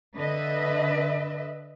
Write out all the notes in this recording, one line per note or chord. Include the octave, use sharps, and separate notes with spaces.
D3 B4 D#5 E5